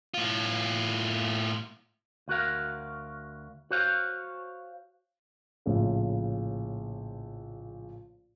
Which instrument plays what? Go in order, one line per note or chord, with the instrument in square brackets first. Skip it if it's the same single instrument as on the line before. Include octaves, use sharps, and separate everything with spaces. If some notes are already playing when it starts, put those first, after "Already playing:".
[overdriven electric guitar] A2 F4
[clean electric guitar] D2 F#4 A#4 F5
F#4 C5 C#5 F5
[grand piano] A#1 A2 C#3